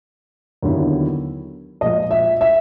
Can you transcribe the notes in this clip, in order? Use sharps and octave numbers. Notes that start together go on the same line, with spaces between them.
D#2 D3 F#3 B3 E4
A#2 F3 G#3 D#5
E5
E5